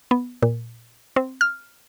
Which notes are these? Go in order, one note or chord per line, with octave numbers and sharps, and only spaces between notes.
B3
A#2
C4
F6